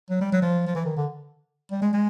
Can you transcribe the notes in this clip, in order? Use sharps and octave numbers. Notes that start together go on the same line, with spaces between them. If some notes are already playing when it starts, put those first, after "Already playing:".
F#3
G3
F#3
F3
F3
E3
D#3
D3
G3
G#3
G#3